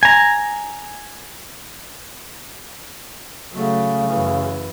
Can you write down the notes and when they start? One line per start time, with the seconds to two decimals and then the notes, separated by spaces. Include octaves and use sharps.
0.03 G#5 A#5
3.52 C#3 F#3 A3
4.07 F#2 E3